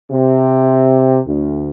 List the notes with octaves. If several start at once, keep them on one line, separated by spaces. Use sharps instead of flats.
C3
D2